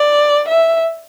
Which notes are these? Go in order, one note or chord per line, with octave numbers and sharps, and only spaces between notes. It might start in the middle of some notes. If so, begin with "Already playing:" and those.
Already playing: D5
E5